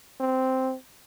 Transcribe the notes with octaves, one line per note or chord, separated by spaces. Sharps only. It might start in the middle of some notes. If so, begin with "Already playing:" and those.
C4